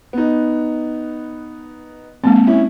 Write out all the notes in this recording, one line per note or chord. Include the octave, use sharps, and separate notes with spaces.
B3 D#4
G#3 A#3 C4 A5
C#4 E4